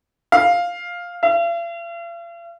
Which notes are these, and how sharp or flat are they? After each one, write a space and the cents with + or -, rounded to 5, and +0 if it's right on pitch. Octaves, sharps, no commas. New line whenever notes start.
F5 +5
F5 -45